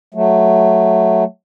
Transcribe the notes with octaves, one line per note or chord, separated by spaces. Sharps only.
F#3 A3